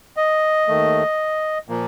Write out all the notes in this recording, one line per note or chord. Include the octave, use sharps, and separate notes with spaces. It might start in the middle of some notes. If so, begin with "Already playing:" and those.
D#5
D#2 D#3 A3
A#2 F3 A#3